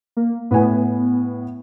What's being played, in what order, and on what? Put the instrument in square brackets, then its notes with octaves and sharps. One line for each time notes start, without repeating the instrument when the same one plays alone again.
[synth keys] A#3
[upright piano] A2 G#5 [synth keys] B3